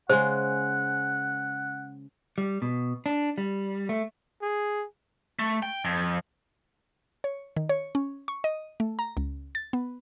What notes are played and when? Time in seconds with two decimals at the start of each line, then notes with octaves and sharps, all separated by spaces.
0.09 C#3 G#3 C5 F#5
2.38 G3
2.62 B2
3.06 D4
3.38 G3
3.89 A3
4.42 G#4
5.39 A3
5.63 G5
5.85 F2
7.24 C#5
7.57 D#3
7.69 C#5
7.95 C#4
8.28 C#6
8.44 D#5
8.80 A3
8.99 A#5
9.17 C#2
9.55 A6
9.73 B3